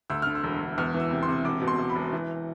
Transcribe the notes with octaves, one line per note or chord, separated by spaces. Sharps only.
D2 E6
D3 F6
E6
E1
E1
E2 F6
E3
E6
C3
C6
C3
E1 D6
B2
C6
E1
B5
E1
E3